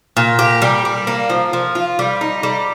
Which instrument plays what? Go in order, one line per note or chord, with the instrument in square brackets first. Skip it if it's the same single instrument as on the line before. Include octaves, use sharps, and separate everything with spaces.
[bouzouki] A#2
G4
G3
D4
A#3
F3
F3
F4
G3
D#4
G3